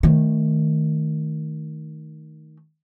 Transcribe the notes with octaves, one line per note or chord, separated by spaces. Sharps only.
D#3 A3